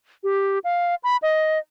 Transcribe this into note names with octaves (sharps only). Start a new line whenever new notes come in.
G4
F5
B5
D#5